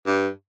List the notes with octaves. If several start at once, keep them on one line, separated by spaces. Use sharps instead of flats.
G2